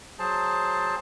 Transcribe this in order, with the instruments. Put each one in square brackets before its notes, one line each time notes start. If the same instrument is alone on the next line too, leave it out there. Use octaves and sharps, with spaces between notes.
[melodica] F#3 G#4 C5 A5